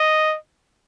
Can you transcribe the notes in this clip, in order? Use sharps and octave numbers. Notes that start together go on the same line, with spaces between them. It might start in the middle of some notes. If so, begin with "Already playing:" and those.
Already playing: D#5